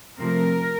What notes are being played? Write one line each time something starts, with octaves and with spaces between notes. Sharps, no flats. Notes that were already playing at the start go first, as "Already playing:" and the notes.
C3 F3 A3 C4 A#4